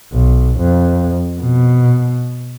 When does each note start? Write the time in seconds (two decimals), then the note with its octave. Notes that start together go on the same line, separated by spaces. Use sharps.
0.13 B1
0.59 F2
1.40 B2